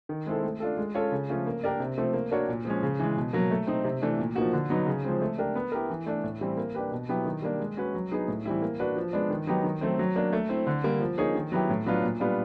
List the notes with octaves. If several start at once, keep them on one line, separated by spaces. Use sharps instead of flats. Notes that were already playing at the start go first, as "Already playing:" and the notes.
D#3
G#3 C4 E4 A4
A3
D4 F4 A4
G#3
C#4 F4 A4 C#5
C#3
F3 A3 C#4 F4
A#3
D4 G4 A#4 D5
C3
F3 A3 C4
A#3
D4 F#4 A#4 C#5
A#2
F3 G#3 C#4
C#3
E3 G#3
B2
F#3 A#3
A3
C4 D#4
C3
E3 A3 D4
A#2
F3 A#3 D#4 F#4
D3
F#3 B3 D#4
C#3
F3 G#3 C4
A3
D4 G4 A#4
B3
E4 G4 A#4
E3
A3 D4
A2
E3 G3 C4 E4
A#3
D4 G4 B4
B2
F#3 B3 E4 G4
D#3
G3 A#3 D4
G#3
C#4 F#4 B4
F#3
B3 D#4 G#4
A2
E3 G3 C4 E4
A#3
D4 F#4 B4
F3
G#3 B3 D4
D#3
F#3 B3 D#4 G4
D#3
F#3 A3 C4
F#3
A#3 D4
A3
C4 E4
D3
G3 A#3
F3
A#3 D#4 G#4 C#5
D#3
F#3 B3 E4 G4
A2
F#3 B3 D4 F4
A#2
G3 B3 D4 F4